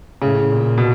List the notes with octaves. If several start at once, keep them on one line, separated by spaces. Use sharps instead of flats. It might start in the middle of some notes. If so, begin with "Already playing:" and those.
A2 C#3
A#2
B2